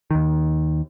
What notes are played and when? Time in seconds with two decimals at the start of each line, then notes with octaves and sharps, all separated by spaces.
0.11 D#2 D#3